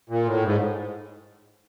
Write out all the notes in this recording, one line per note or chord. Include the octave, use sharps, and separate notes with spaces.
A#2
A2
G#2